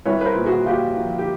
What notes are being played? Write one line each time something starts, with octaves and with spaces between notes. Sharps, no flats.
C2 B4 C#5
B4
A#4 C5
A#2
F#4 G#4
A#2 F4 G4
F3
G4